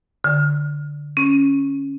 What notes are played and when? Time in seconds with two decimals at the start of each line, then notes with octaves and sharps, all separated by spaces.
0.24 D3
1.17 C#4